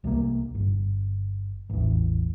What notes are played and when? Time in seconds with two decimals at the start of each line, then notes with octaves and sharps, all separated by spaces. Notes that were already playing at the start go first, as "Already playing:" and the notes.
0.04 C2 C3 G#3 A#3
0.55 G1
1.70 A1 E2